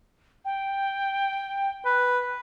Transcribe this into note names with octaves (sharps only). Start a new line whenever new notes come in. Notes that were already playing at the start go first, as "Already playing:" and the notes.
G5
B4